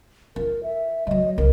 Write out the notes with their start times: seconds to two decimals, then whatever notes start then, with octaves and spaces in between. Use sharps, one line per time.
0.36 F4 A#4
0.63 E5
1.07 F3 F#3 D#5
1.38 C2 E4 A#4